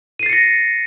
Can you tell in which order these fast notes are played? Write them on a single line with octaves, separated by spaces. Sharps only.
D#7 C7 A6 C#7 A#6